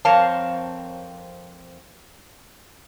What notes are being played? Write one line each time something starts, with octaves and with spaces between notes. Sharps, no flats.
F2 C4 A#4 C#5 F5 A5